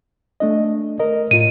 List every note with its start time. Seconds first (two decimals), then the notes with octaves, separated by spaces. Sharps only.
0.40 A3 D4 D#5
0.99 A#4 D#5
1.31 A2 F4 D#7